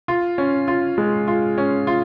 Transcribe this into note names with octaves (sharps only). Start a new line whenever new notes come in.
F4
C#4
F4
G#3
F4
C#4
F4